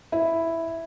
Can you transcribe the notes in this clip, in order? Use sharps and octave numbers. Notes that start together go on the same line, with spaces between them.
E4